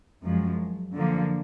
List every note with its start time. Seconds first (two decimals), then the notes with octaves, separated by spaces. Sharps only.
0.23 F#2 F3 G#3
0.94 D3 F3 A#3